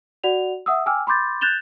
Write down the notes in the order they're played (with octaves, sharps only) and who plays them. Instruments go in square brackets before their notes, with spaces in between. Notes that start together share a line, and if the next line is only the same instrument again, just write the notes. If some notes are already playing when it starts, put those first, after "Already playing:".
[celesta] F#4 D5 F#5 F7
E5 F#5 D#6 E6
G5 G#5 D6 E6 F6
B5 C6 D6 G6 A6
F#6 G6 A6 E7 F7 G7